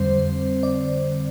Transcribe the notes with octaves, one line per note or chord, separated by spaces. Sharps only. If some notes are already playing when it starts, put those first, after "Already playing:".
Already playing: F2 D3 G3 C4 C5
D5